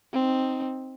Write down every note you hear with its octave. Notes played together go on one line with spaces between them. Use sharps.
C4 D#4